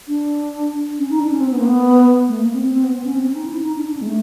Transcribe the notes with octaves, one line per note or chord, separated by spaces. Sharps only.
D4
C#4
D#4
D4
C#4
C4
B3
A#3
B3
A3
A#3
C4
C4
C4
B3
B3
C#4
C4
C#4
D#4
E4
D#4
D4
D4
C#4
G#3
A3